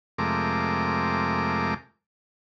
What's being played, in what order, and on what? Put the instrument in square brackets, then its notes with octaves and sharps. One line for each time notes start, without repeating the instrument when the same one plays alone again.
[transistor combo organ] F2 C3 G#3 A3 A#4 D6